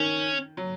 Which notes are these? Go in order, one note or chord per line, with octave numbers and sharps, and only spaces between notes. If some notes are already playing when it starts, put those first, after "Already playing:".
Already playing: D#3 C#4
F#3